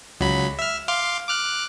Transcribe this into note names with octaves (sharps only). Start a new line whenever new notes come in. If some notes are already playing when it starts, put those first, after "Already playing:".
C#2 F#3 B5
E5 F6
F5 C6 D6
D6 F6 F#6